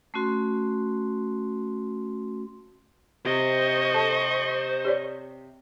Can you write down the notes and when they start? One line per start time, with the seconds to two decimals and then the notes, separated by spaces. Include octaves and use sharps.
0.14 A3 C#4 F#4 C6
3.25 C3 C5 D#5 C#6
3.94 A4 A5
4.85 G4 C#5 D5